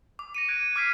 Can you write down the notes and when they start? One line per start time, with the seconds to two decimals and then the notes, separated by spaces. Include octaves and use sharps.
0.19 D6
0.35 A#6 C#7 D#7
0.48 F#6 G#6 D7
0.76 D6 F6 G#6 B6 C7